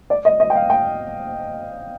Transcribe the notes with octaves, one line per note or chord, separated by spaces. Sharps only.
D5
D#5
D#5
G5
F5
G5